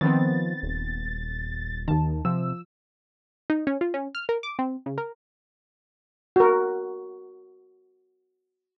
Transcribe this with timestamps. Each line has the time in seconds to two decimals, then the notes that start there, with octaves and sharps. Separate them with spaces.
0.01 D#3 F3 B3 C4 A6
0.63 D#1
1.88 D#2 D#3 A5
2.25 C3 F3 E6
3.50 D#4
3.67 C#4
3.81 F4
3.94 C#4
4.15 F6
4.29 A#4
4.43 D6
4.59 C4
4.86 C#3
4.98 A#4
6.36 F#4 A#4